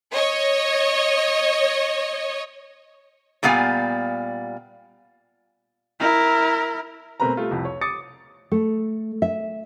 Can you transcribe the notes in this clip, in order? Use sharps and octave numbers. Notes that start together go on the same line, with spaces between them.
C#5 D#5
A#2 G3 B3 F5 G#5
E4 A#4
B2 A3 C4 A#4 B4 A#5
G3 A3 F4
C2 F2
C#5
D6 D#6 A6 C#7
A3
E5